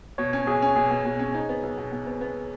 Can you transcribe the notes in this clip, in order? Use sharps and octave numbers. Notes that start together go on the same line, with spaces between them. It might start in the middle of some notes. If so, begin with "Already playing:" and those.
B2 C#5
C#4
B1 G#4
C#4
B2 G#4
B2
B2
C#4
D#4
B3
B1
B2
B2
B3
B3